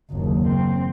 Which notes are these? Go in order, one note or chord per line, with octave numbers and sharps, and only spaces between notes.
F#1 D#2
C4